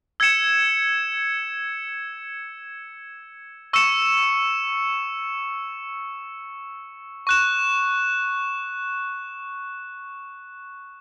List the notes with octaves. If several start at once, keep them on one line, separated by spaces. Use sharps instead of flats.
E6 G#6 C#7 E7
C#6 E6 C#7 E7
C#6 F#6 E7